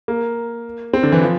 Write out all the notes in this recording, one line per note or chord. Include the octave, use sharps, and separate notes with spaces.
A#3
C4
D3
E3
F3